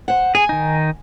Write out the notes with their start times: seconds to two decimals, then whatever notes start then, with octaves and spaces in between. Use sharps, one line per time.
0.08 C5 F#5
0.35 G#4 G#5
0.49 D#3 D#4